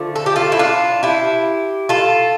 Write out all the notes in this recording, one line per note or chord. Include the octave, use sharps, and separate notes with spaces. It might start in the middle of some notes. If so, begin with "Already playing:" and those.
Already playing: D3 F3 A3
A4
G4
F4 A4
E4
D4 F4
E4 G4
F4 A4